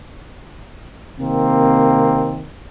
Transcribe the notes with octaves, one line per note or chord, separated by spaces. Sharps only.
C3 D#3 A#3 C4